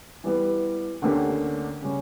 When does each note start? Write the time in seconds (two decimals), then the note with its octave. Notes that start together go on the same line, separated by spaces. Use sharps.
0.24 E3 G3 B3
1.02 D2 D3 A#3 C#4 G4
1.82 C#3 G3 C#4